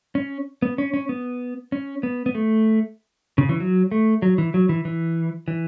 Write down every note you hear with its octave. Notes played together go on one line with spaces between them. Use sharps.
C#4
B3
C#4
C#4
B3
C#4
B3
B3
A3
C#3
E3
F#3
A3
F#3
E3
F#3
E3
E3
E3